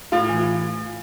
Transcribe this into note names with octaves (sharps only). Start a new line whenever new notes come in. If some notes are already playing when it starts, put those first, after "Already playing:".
A2 F4
E3